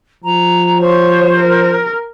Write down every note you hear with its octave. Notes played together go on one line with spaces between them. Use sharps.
F3 A#5
C5 C#5
A#4